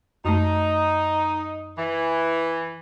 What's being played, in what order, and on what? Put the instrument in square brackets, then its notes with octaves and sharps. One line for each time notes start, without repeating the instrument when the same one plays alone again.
[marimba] F#2 A3 [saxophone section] D#4
[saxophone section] E3